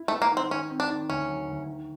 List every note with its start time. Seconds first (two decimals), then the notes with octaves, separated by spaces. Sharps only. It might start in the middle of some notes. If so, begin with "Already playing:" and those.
Already playing: E4
0.08 A3
0.12 B3
0.22 A#3
0.32 D#3
0.37 C4
0.51 D#3 C#4
0.70 C4
0.80 D4
0.90 D#3
1.09 D2 C#4
1.28 F#3
1.48 D2
1.67 D#3